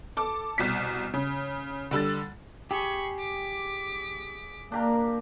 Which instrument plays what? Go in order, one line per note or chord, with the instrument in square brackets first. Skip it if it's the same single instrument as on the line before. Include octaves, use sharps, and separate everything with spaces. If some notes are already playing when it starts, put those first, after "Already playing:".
[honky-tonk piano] A4 D6
C2 B2 B6
C#3
D3 G3 E6 A6
[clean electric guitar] G4 [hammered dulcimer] G#4 [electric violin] B5 C#6
[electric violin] D6 B6
[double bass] A#3 [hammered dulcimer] D4 G4 A#4